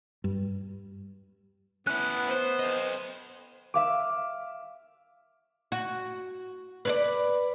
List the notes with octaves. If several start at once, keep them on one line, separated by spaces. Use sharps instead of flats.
G2
B3 C#4 E4 F#6
C5
A4 D#5
E5 F5 D6
F#4
B4 C#5 D5